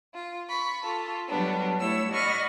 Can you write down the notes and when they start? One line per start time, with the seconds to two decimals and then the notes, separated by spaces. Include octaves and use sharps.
0.14 F4
0.49 B5 C#6
0.83 F4 A4
1.28 F#3 G3 B3 D4
1.79 G3 A3 E4 C#5 E6
2.11 D5 D#5 F#5 B5 C#6 F6